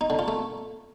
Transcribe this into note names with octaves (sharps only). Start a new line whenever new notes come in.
D#4
D3
F4
A3